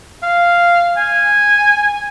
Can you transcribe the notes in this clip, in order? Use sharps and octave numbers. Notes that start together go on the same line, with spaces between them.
F5
G#5